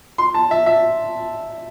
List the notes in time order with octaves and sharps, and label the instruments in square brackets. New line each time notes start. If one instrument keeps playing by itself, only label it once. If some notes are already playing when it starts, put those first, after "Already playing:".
[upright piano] C6
A5
E5
E5